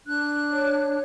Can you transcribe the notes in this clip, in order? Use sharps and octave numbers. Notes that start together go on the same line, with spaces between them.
D4 F#6
C#5